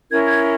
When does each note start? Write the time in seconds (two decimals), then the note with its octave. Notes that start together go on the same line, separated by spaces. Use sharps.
0.10 C#4 E4 A#4 G#6
0.26 G#6